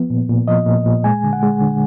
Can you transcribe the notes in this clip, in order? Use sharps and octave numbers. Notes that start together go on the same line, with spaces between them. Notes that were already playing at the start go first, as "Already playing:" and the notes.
Already playing: F3 B3
A#2
A#2
F3 D#5
A#2
A#2
G#3 G#5
D3
F#5
G#3
D3